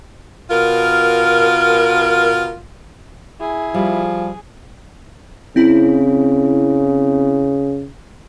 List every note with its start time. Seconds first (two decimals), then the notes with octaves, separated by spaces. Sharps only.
0.50 B2 F4 A#4
3.41 E4 G#4
3.74 F3 G3
5.56 C#3 C4 E4